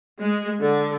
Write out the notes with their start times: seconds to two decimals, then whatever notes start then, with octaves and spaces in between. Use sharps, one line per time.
0.20 G#3
0.61 D3